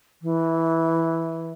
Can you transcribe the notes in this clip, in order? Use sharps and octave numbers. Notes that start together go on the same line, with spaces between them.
E3